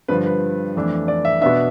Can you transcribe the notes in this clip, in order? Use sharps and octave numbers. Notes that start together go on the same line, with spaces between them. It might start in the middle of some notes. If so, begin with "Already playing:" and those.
G2 D3 F3 B4
B4
F2 E3 A3 D4
D5
E5
B2 B3 D4 E5